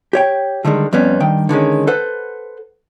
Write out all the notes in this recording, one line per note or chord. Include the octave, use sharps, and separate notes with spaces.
G4 C#5 G5
D3 D#3 G3 G#3
F2 G3 B3 C#4
G2 D#3 G5
D3 D#3 G#3 C#4
A4 B4 C5 F#5